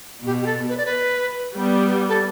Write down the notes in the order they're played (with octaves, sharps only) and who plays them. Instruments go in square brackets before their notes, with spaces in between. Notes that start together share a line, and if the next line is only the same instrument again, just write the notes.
[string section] B2 [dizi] G4
[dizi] G4
A4
B4
D5
B4
[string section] G3 B3
[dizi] A4